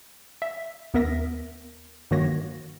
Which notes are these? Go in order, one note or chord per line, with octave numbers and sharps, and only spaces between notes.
E5
D#2 B3 A#4 E5 A#6
G2 D#3 A#3 F#4 C#5 A#6